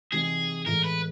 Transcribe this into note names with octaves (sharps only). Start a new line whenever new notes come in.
C3 E3 G3 C4 D#4 G#4
A2 E3 G#3 A#4
B4